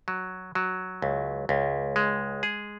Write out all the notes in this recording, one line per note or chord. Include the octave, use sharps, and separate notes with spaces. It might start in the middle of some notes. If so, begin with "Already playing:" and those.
F#3
F#3
C#2
C#2
G#3
G#4